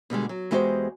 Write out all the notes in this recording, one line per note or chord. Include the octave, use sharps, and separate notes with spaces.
B2 D3 G3 G#3
F#3
E2 G#3 E4 F#4 G4 C5